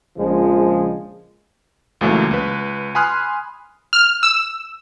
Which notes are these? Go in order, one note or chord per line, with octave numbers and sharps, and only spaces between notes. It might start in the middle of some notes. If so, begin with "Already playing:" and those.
A#1 C#3 F3 G#3
C#2 A#2 E3 F#3 A3 A#3
C#2 B4
G#5 B5 C6 D#6 F6 F#6
F6
E6